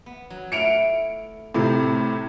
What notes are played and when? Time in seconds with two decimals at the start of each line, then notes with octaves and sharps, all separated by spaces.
0.06 B3
0.30 F#3
0.52 A3 E4 F5 C#7 D7 F7
1.54 A2 C3 A#4 C5